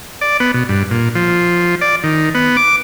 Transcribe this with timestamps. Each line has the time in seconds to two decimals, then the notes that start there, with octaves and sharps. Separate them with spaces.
0.21 D5
0.40 B3
0.54 B2
0.69 G2
0.91 A#2
1.15 F3
1.81 D5
2.04 D#3
2.35 B3
2.57 D6